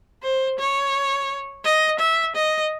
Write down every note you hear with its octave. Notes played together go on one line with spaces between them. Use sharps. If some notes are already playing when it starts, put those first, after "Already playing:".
C5
C#5
D#5
E5
D#5